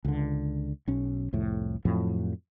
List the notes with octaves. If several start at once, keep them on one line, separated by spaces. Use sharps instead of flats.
C#2 D3
B1 C#4
C2 F2 A2
F2 A2 F3 F#3